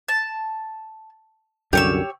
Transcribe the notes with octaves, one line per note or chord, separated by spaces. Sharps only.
A5
C2 F#2 D3 G4 C#5 E6